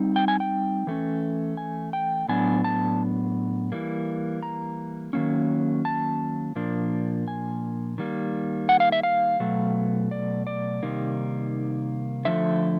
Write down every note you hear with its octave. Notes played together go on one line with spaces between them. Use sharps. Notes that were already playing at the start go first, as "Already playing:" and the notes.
Already playing: G3 C4 D#4
G5
G#5
G5
E3 A3 C#4
G#5
G5
A2 F#3 B3 D4 G#5
A5
E3 G3 A#3
A#5
D#3 F#3 A#3 C#4
A5
A#2 F3 A#3 D4
G#5
D#3 G3 A#3
F#5
F5
E5
F5
B2 F#3 A3
D5
D5
C3 D#3 G3 A#3 D#4
D3 F3 A3 E5